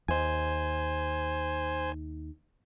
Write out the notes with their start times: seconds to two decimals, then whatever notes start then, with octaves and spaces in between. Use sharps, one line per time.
0.08 D#2 C5 G#5